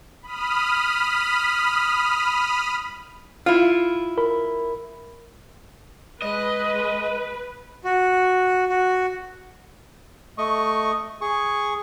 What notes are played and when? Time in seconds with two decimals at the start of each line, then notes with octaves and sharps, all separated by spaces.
0.22 B5 D#6 F6
3.46 E4 F4 F6
4.18 A#4 B5
6.22 G#3 B4 D#5
7.84 F#4
8.69 F#4
10.38 A3 D#5 C#6
11.21 G#4 C#6